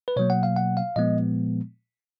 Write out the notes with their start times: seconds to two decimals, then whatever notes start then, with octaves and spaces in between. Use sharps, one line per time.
0.08 B4
0.16 B2 F#3 A#3 C#5
0.30 F#5
0.43 F5
0.56 F#5
0.77 F5
0.96 A#2 F3 G#3 B3 D#5